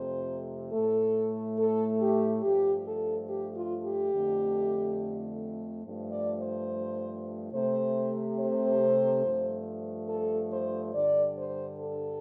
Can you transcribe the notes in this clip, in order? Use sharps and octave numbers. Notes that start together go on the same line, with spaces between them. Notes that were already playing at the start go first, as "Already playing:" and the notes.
Already playing: F2 C3 A3 C5
A2 A3 A4
A4
G4
G2 F3 A3 G4
A4
G4
F4
G4
F2 D3 A3
G2 F3 A3
D5
C5
C3 A3 C5
C5
G2 F3 A3
A4
C5
G2 D3 G3 D5
C5
A4